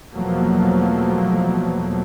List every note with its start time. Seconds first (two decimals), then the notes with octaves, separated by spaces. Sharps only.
0.13 E2 B2 F3 F#3 A3 A#3